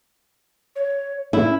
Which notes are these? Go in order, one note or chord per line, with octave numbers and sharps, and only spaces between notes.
C#5
C#4 E4